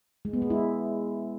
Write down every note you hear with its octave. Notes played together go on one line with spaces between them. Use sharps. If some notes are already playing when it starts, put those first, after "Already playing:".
G#3
B3
G#3
E4